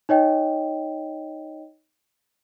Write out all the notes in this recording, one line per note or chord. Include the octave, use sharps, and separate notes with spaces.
D#4 C#5 D#5 G5